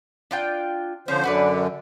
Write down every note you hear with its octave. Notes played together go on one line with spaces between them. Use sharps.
D4 F4 G5
D3 F3 C#4 C5
F#2 D3 F#4 B4 D5